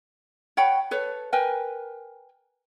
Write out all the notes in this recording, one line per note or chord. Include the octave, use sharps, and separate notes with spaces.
C#5 F#5 G5 B5
A4 B4 C#5
A#4 B4 G5 G#5